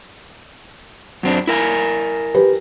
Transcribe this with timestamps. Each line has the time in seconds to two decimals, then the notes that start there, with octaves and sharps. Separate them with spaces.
1.23 F#2 C4 D4
1.47 E4 A#4 G#5
2.35 G4 B4